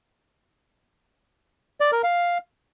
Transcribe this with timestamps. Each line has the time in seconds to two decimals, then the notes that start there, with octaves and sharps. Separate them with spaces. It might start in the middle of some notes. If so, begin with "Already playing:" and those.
1.81 D5
1.92 A#4
2.04 F5